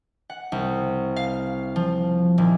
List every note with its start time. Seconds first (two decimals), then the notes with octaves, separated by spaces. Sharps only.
0.30 F#5
0.52 C2
1.16 F5
1.76 F3
2.38 D#1